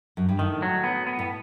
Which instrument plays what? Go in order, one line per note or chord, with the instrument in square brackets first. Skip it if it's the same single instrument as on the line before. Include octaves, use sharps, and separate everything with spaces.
[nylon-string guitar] F#2
G2
[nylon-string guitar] A2 [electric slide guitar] D#3
[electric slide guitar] F#3
B3
B3
[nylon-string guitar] A2